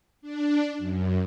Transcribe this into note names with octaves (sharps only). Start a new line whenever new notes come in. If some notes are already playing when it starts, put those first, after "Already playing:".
D4
F#2